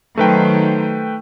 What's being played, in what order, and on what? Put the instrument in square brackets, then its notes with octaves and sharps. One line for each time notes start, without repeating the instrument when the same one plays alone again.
[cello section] D#3 F#3 C5 [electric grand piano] A3 B4 G5